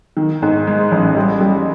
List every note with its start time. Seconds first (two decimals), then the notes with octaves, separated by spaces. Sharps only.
0.17 D#3
0.42 G#2
0.67 G#3
0.92 A1
1.17 G3
1.40 G3